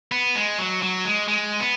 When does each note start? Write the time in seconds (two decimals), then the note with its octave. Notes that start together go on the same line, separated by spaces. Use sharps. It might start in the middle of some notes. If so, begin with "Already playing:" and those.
0.12 B3
0.35 G#3
0.59 F#3
0.82 F#3
1.05 G#3
1.28 G#3
1.60 B3